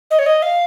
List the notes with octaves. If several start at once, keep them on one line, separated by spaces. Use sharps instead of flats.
D#5
C#5
D#5
F5